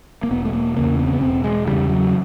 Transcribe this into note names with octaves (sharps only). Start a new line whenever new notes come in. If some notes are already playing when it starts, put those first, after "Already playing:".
A#3
E1 B3
A3
A#3
E2 C#3 A#3
B3
C4
B3
E1 C4
G#3
E2 C#3 G3
F#3